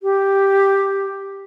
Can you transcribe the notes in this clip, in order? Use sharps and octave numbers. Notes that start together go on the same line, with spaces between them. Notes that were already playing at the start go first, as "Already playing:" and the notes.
G4